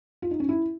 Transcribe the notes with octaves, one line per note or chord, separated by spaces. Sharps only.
F4
D#4
C#4
E4